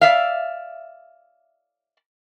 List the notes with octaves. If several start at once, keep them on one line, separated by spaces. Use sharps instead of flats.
D5 E5 F5